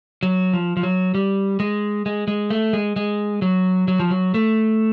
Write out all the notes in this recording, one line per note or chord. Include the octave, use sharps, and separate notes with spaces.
F#3
F3
F3
F#3
G3
G#3
G#3
G#3
A3
G#3
G#3
F#3
F#3
F3
F#3
A3